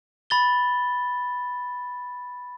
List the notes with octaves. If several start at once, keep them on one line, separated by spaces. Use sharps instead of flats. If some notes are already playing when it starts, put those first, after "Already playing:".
B5 A6 G7